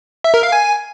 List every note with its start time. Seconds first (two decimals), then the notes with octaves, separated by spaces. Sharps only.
0.24 E5
0.34 A#4
0.43 F5
0.52 G#5